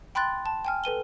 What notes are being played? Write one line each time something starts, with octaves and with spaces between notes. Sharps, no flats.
G5 B5 C6 F#6 A6
A5
G5 G#5 F6
A4 B4 D#7 G7